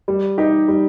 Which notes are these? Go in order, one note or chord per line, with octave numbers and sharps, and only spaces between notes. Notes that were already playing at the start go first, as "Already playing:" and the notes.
G3
D#4 G4
G3